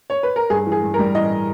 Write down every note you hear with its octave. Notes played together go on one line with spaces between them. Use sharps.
C#5
B4
A#4
G2 G#4
E3
G#4
G2
A#4
G3
E3 D#5